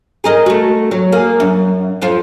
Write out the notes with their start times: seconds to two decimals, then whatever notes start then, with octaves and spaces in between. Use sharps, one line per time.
0.24 G#4 A#4 D#5
0.46 A3 F#4
0.91 F#3
1.12 A#3 G#4
1.40 F#2
2.02 F2 F3 F4